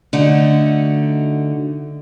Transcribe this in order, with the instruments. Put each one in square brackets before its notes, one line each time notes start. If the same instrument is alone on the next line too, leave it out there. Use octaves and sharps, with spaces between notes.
[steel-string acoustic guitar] D3 A3 D#4 F#4